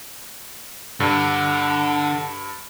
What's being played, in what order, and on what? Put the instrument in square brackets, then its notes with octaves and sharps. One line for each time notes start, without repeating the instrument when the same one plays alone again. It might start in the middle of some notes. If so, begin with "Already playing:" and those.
[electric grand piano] G2 [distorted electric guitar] D3